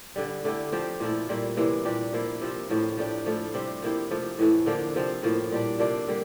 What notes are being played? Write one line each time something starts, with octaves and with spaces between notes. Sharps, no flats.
G2 D3 G3
D3 A3 E4 G4
F3 C4 G4
A#2 F3 A3 E4
A#2 G3 A#3 E4
C3 E3 A#3 E4
A#2 G3 D4 G4
F3 A#3 E4
C3 F3 C4
A2 F3 A#3
F3 A3 D4 G4
F3 A3 E4
C3 G3 C4 G4
F3 A#3 E4 G4
C3 F3 A3
A2 E3 A3
D3 F3 A#3 D4
C3 F3 C4
A2 F3 A#3
A#2 G3 D4
C3 F3 A#3 D4
D3 G3 A#3